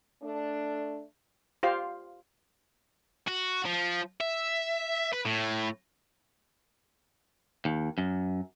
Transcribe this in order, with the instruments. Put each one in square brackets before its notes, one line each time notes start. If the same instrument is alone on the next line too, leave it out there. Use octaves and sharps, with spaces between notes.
[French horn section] A3 D4
[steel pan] F4 G4 C5 F5
[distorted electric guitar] F#4
F3
E5
B4
A2
[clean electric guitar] D#2
F#2